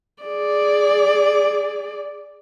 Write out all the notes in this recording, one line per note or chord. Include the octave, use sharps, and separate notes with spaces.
G#4 D5